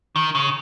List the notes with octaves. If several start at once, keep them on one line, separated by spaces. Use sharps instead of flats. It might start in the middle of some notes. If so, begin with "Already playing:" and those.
D#3
C#3